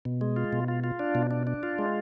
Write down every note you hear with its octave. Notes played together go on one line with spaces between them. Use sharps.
B2
G#3
F4
B2
F4
F4
D4
B2
D4
D4
F4
G#3